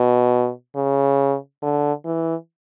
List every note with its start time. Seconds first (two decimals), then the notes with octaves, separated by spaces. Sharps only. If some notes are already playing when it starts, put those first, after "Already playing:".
Already playing: B2
0.76 C#3
1.62 D3
2.05 E3